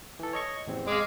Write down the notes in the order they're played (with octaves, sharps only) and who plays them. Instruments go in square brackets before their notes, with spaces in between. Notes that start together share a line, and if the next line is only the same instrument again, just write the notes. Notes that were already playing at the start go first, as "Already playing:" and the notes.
[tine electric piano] E3 A4
C#5 D#5 C#6
A1 E2 C4
[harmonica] G#3 [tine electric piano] F5 D6